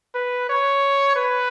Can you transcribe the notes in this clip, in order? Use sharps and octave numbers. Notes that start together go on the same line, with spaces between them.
B4
C#5
B4